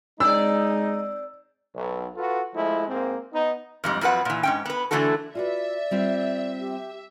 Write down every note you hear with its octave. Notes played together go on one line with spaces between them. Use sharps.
G#3 C4 D#4 D5 E6
B1
F4 F#4 A4 B4
F3 G#3 A3 E4
G#2 A#3 C4
B3 D#4
F2 G#2 G3
F2 F3 F#3 B4 F#5
A#2 E3
G#2 C#4 G5
B3 B4
D3 E3 A3 D4 F#4 A4
F4 F#4 B4 D5 E5
G3 C4 F4
G4